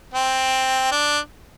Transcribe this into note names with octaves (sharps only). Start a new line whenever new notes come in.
C4
D4